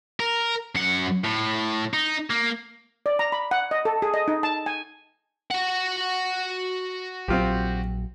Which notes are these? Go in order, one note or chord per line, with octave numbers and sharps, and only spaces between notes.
A#4
F#2 F#5
A2
D#4
A#3
D5
A#5
B5
F#5
D#5
A4
G#4
D#5
D#4
A5
G#5
F#4 F#5
A#1 F#3 C4 F4 G4